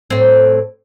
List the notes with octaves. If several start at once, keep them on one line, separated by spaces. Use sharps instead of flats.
A2 C4